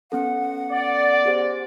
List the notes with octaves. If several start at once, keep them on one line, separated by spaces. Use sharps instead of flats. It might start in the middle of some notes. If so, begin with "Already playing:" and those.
B3 C#4 A4 F#5
D5
G4 G#4 C5